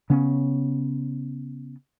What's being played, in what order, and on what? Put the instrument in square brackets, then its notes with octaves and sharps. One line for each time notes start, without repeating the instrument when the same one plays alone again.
[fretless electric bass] C#3 B3 C#4